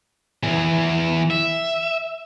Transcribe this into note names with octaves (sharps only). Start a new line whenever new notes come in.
E3 G#4
E5